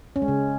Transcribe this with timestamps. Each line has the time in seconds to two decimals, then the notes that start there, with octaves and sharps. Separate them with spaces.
0.16 C#4
0.22 G#3
0.28 C#3